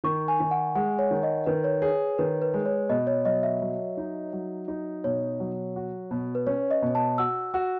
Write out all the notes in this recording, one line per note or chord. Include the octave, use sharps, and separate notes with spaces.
D#3 C#6
G#5
D#3
F#5
G#3 F#5
C#5
D#3
D#5
D#3 B4
C#5
G#4 C#5
D#3 B4
B4
G#3
C#5
B2 D#5
C#5
F#3 D#5
E5
F#3
D#4
F#3
D#4
B2 C#5
F#3
F#4
B2
B4
C#4 C#5
D#5
B2
A5
F#4 E6
F#4